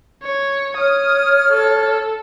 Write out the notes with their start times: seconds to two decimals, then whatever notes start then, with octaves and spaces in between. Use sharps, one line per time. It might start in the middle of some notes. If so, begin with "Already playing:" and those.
0.23 C#5
0.78 C#5 D#6 F6
1.50 A4